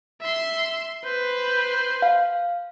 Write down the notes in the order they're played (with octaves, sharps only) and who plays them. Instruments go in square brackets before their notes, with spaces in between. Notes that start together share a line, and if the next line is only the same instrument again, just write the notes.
[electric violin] E5 C6
[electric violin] B4 [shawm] C5
[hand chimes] F5